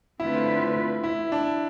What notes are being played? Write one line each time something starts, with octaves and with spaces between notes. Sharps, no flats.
D3 A3 C4 E4 F4 B4
E4
D4